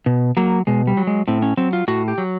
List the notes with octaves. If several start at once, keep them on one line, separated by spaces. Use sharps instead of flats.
B2
F#3 A#3
B2 G#3
G3
F#3
G#3
A2 C4
C#4
F#3 C4
F4
A2 F#4
G4
F#3